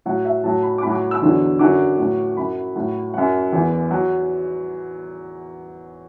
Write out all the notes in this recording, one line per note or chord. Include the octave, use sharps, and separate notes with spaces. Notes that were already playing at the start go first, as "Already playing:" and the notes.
A2 F#3 F#5
E5
A2 F#3 A5
B5
D6
A2 F#3 B5
D6
E6
E2 D3 F#3
F#2 D3 F#3 D6
A2 F#3
F#2 F#3 B5
A2 F#3
F#2 F#3 F#5
E2 E3
F#3